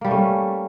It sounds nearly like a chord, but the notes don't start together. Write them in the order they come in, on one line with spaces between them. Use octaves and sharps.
A#3 G3 A3 C#4